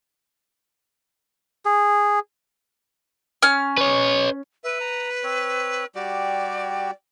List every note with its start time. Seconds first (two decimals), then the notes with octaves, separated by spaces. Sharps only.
1.65 G#4
3.43 C#4 F6
3.78 B4 C#5
4.64 B4 E5
4.80 A#5
5.23 C4 C#5
5.95 G3 F#4 G4 D5